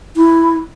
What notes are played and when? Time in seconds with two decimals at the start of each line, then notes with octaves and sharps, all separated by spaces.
0.16 E4